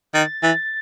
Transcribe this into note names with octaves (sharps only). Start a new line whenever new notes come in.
D#3 A6
E3 A6